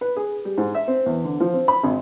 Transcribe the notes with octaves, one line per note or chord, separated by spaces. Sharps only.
B4
G#4
G3
G#2
E5
C4
E2
D3
F3
C4
B5
G#1